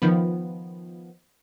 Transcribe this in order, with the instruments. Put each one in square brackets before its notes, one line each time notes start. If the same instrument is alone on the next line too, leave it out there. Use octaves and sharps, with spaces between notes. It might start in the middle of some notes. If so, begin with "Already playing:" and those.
[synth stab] D#3 F3 B3